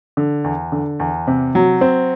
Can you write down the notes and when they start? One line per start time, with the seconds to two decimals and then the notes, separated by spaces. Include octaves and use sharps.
0.17 D3
0.44 E2
0.72 D3
1.00 E2
1.27 C3
1.55 F#3
1.81 C4